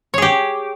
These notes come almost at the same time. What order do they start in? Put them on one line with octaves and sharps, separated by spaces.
C#5 G#4 G4